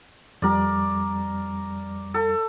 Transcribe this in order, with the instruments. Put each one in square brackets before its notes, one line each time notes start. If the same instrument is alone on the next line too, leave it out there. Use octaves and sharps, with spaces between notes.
[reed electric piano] F2 G3 [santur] A#4 D5
[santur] A4